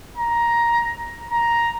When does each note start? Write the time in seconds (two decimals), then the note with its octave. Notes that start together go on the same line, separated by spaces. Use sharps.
0.17 A#5
1.31 A#5